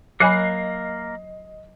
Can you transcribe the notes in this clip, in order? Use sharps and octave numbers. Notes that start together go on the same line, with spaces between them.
F#3 A#3 A#4 D#5 G#5 B5 F#6 C7